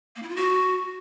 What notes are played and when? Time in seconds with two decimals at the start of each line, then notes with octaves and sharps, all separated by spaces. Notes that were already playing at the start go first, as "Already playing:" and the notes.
0.16 A#3
0.23 E4
0.29 F4
0.36 F#4